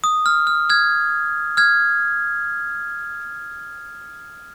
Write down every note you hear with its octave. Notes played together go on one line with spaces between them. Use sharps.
D#6
F6
F6
F6 G#6
F6 G#6